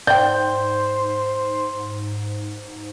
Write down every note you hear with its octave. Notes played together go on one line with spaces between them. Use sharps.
G#2 C5 D5 G5 G6